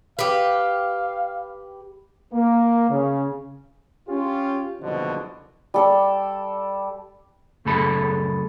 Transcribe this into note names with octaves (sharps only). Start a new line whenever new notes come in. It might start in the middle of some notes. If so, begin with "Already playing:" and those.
G4 B4 F5
A#3
C#3
C#4 F4 G4
F#1 C2 B2 D3 F3 D#5
G3 A4 D5
C#2 F#2 A3 G#4 A4 B5